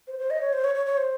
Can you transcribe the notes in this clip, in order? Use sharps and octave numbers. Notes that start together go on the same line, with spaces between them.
C5
C5
D#5
C#5
C5
C#5
C#5
C#5
C5